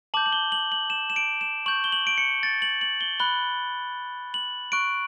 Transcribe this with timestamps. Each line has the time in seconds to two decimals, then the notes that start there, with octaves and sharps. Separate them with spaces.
0.14 A5 D6 G6 F#7
0.26 F#7
0.33 G7
0.52 F#7
0.72 F#7
0.90 E7
1.10 E7
1.16 D7
1.41 E7
1.66 C#6 G6 F#7
1.84 G7
1.92 F#7
2.07 D7
2.18 C#7
2.43 A6
2.62 F#7
2.81 F#7
3.01 G7
3.20 B5 F#6 G7
4.34 F#7
4.72 C#6 F#6 D7